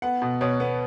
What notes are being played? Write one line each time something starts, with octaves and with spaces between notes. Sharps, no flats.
B3 F#5
B2
B2 C#5
B3